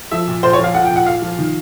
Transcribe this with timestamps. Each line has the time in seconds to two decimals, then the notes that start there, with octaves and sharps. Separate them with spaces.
0.11 F3 E5
0.28 A#2
0.43 A#2 C5
0.53 C#5
0.59 F3 F5
0.74 F3 F#5
0.85 G5
0.91 A#2
0.96 F#5
1.06 A#2 F5
1.22 F3
1.39 D#3